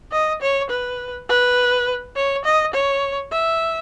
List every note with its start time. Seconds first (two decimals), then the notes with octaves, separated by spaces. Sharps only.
0.12 D#5
0.42 C#5
0.70 B4
1.29 B4
2.16 C#5
2.45 D#5
2.74 C#5
3.32 E5